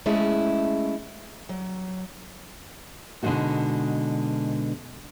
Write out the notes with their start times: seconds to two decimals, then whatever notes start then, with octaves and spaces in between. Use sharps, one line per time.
0.06 G#3 A3 C#4 E4 G#4
1.49 F#3
3.23 B2 D3 G#3 D4 D#4 F#4